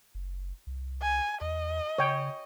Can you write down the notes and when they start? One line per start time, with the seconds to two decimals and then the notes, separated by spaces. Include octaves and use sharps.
0.15 F#1
0.67 C2
1.02 G#5
1.41 E2 D#5
1.98 C#3 C#5 G5